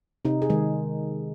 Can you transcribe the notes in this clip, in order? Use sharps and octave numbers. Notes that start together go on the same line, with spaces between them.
C3 D#4
G#4
D#3 G#3